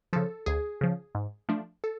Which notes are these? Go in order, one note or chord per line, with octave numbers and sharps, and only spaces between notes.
C#3 F3 A4
D2 G#4
C#3 F3
G#2
F3 A3 D4
A4